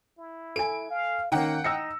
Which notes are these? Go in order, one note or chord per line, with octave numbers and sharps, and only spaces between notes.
E4
A4 G#5 D7
F5
D#3 A#3 C#4 F#5 G5
D#4 E6 A#6 C#7